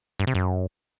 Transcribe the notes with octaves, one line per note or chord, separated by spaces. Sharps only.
G2
C3
F#2